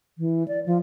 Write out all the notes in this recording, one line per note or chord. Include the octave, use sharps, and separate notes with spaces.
E3
D5
F3